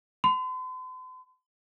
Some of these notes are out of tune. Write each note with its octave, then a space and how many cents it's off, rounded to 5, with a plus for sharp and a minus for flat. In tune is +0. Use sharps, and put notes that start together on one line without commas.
C6 -45